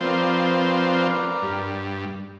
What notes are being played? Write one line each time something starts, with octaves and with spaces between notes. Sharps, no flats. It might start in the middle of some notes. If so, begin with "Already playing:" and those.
F3 C4 A#4 B4 D5
G2